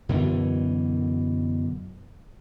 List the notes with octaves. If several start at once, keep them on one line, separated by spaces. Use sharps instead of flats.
F#2 B2 D3 E3